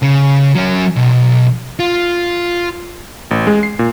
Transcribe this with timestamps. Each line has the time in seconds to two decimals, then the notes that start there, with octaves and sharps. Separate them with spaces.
0.02 C#3
0.55 F#3 C#4
0.96 B1
1.79 F4
3.31 A1
3.47 G#3
3.63 C7
3.79 A#2